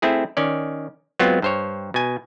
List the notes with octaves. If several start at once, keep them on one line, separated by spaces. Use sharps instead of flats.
A3 C4 E4 G#4
D#3 C#4 D5
F#3 G#3 B3 C4 F4
G2 C5 C#5
B2 G#5